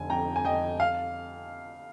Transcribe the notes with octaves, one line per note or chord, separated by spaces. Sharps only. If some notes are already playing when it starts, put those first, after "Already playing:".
Already playing: F1 D3 G#5
F2 G5 A#5
G#5
F2 D#5 G5
F5